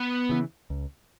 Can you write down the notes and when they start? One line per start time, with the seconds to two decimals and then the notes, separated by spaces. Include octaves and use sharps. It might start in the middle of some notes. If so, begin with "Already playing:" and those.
Already playing: B3
0.29 C#3 E3
0.70 C#2